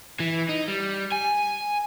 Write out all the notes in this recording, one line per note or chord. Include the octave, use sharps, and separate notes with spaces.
E3
D#4
G3
G#5